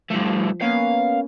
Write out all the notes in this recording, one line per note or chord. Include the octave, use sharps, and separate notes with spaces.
G2 F3 A3
A#3 B3 C#4 F5